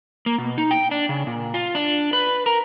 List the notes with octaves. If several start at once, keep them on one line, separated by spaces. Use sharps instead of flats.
A#3
B2
D#4
G5
D4
C#3
A#2
F4
D4
B4
A#4